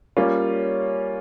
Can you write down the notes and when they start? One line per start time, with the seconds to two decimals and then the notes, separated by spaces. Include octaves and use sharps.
0.17 G3 A#3 C#4 F4